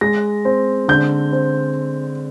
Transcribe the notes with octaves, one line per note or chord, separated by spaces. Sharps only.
G#3 A#6
C4
D3 G6
C4